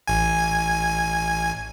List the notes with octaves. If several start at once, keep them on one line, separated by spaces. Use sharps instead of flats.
A1 G#5